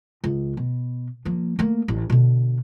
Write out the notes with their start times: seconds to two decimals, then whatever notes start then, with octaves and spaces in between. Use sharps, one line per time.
0.24 C#2
0.57 B2
1.25 F3 A#3
1.59 A3 A#3
1.88 A1
2.10 B2 D3